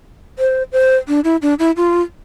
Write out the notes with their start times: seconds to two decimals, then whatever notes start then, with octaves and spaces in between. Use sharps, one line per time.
0.39 C5
0.72 C5
1.08 D4
1.24 E4
1.42 D4
1.59 E4
1.77 F4